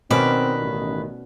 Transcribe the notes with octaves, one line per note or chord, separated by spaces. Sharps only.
B2 D#3 C4 C#4 B4 D5 D6
A1